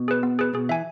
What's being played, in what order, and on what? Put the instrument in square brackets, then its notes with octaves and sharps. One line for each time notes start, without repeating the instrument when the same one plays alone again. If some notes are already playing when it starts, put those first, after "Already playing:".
Already playing: [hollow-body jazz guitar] B2
[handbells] G#4 B4
B3
G#4 B4
[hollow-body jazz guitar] B2 [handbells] G#4
[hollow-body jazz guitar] E3 [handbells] E5 G#5